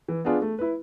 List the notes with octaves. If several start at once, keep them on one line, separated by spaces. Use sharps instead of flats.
E3
B3 D4 F4 G#4
A3
E4 B4